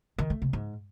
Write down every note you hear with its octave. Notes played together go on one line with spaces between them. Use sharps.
D#3
A3
C3
G#2